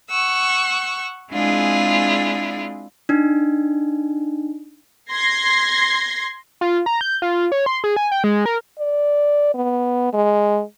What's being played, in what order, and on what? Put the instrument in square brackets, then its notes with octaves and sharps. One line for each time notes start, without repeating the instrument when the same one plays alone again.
[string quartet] F#5 C#6 E6
G#3 C4 D4 E4 F4 G#4
[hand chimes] D4 D#4
[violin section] C6 G#6 A#6 C7
[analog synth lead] F4
A#5
G6
F4
C#5
C6
G#4
G#5
G5
G#3
A#4
[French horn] D5
B3
G#3